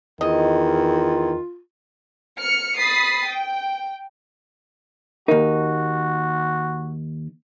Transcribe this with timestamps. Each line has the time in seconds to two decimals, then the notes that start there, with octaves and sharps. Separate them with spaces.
0.21 E2 D#3 F4 D#5
2.38 F6 C#7
2.79 B5 D#6 A6 B6 C7
3.25 G5
5.28 D#2 D#4 F#4 A#4